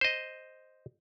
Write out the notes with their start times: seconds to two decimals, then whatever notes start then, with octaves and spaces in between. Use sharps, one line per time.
0.01 C5 D#5